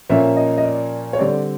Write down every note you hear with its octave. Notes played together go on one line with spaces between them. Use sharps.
A#2 F3 A#3 C#4 E5
D#5
D#5
D5
C#5
D3 G3 C4 D5